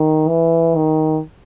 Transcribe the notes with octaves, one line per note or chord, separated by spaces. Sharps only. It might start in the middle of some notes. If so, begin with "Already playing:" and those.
Already playing: D#3
E3
D#3